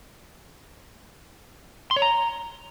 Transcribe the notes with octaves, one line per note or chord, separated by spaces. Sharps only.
C6
C#5
A#5